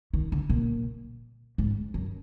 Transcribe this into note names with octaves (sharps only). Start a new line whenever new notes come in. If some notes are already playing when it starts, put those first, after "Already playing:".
D#3
D3
A#2
G#2
F#2